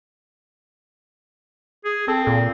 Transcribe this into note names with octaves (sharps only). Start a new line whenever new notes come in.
G#4
C4 A4
A#2